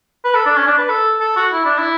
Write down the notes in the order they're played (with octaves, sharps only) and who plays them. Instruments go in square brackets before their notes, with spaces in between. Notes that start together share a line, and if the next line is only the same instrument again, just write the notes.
[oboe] B4
A4
D4
C#4
D4
B4
A4
A4
F#4
E4
D4
E4